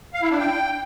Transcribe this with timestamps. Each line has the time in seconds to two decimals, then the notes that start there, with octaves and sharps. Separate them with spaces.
0.13 F5
0.22 E4
0.30 D4
0.38 G5